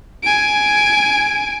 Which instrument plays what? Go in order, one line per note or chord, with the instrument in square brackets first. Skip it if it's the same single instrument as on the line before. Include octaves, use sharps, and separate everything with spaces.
[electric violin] G#5 D7